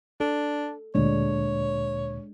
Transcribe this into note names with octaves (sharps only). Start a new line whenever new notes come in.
D4 A4
D2 A#2 G#3 D4 C#5